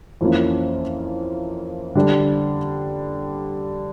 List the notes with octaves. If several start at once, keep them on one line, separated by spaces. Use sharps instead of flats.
F2 E3 A#3 C#4 F4
D3 G3 D4